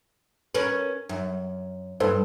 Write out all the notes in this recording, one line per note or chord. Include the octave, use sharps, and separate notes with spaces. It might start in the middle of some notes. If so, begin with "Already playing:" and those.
C#4 A#4 B4
F#2
G2 A4 B4 C5